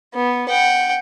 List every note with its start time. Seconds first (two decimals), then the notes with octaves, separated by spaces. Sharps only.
0.14 B3
0.49 F#5 G5